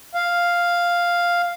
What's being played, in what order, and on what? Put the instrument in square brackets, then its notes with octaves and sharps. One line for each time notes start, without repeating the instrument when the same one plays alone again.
[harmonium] F5